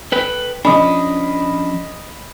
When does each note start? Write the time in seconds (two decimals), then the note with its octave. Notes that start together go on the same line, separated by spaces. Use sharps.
0.12 A4 B4 G5
0.65 F3 C#4 D4 D#5 B5